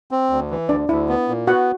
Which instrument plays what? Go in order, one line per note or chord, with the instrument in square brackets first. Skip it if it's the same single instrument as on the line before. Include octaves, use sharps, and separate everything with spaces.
[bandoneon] C4
D2
E3
[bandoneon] D2 [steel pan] D4 D5
[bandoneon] D2 [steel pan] E4 E5
[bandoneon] B3
A#2
[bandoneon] B3 [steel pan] F#4 F#5